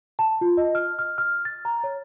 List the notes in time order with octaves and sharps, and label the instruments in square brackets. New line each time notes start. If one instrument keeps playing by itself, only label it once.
[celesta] A5
F4
D#5
F6
F6
F6
A6
A#5
C#5